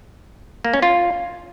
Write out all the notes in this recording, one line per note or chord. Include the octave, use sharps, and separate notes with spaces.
A#3
C#4
F4